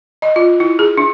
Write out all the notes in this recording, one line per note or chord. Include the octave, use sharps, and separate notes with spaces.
D#5
F4
E4
G#4
D4